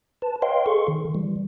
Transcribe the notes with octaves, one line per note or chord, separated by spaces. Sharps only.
B4 A5
B4 C#5 D#5 F5 G5 C6
G#4 A4 C6 C#6
D#3
E3 G3